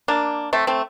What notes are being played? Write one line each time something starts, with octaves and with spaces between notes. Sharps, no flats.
A#3 D4
A3 C4
A3 C4